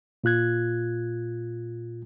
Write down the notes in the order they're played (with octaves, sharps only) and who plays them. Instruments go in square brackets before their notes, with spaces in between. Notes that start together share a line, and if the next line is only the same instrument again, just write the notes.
[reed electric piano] A#2 F4 F#6 G#6